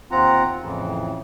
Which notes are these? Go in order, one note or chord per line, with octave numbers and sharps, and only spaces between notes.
D#2 C4 F4 F#5 A#5
F2 A2 C#3 E3